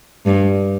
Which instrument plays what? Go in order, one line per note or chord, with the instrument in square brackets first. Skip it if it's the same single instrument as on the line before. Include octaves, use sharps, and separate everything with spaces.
[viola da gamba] G2